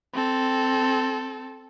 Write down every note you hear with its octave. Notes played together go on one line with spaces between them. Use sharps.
C4 A4